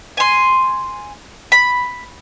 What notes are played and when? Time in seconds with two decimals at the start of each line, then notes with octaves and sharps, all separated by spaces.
0.17 G#5 C6
1.52 B5